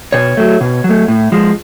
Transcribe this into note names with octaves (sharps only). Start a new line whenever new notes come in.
B2 C#5
F#3 A3
B2
F#3 A3
A2
F3 G#3